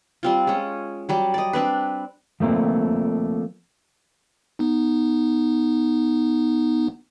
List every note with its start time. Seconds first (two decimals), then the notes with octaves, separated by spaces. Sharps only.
0.23 G3 C4 F4
0.47 G#3 C#4
1.09 F#3 G3 G4
1.34 D5 D#5
1.53 C4 D4 B4
2.40 F3 A3 A#3 C4
4.59 B3 D#4